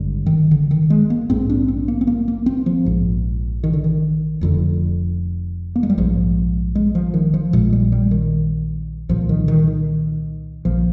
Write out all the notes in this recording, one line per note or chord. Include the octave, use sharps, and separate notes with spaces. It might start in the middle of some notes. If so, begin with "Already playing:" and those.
Already playing: G#1 G2 D3
D#3
D3
D#3
G#3
A#3
A#1 G#2 C4
D4
C4
A#3
C4
A#3
A#3
C4
F3
A#1 G#2
D#3
D3
D#3
F1 F2 D3
A#3
G#3
G3
A#1 G#2 F3
G#3
F3
D#3
F3
A#1 A#2 G#3
G3
G3
D#3
C2 A#2 F3
D#3
D#3
D#3
A#1 F3